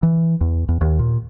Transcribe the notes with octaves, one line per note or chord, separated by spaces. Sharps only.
E3
E2
E2
D#2
A#2